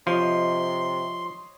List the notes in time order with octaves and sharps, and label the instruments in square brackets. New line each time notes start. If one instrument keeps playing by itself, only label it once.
[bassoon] C3 [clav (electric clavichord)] F3 [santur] C#5 D#5 [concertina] C6